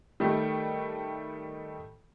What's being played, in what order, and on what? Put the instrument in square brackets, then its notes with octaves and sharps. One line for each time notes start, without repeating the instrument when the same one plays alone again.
[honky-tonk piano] D#3 G3 A3